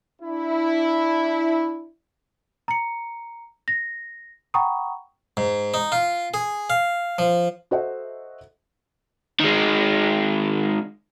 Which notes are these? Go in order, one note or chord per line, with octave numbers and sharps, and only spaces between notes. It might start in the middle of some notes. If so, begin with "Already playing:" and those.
D4 E4
A#5 C#7
A#6
F#5 G5 A#5 B5 C#6 D#6
G#2
D#4
F4
G#4
F5
F3
F#4 A4 C5 D#5 E5 F#5
D#3 G#3